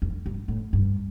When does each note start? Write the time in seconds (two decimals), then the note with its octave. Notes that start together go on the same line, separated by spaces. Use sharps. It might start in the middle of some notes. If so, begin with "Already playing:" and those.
0.02 F2
0.26 G2
0.48 A2
0.73 G2